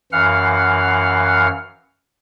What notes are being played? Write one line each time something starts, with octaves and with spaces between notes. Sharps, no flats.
F#2 E3 F5 F#5 F6